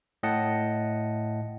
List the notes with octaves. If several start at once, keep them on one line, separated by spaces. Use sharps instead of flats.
A2 D#5 F#5 G5 A5 C#7